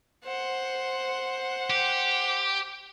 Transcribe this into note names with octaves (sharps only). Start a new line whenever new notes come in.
C5 F#5
G4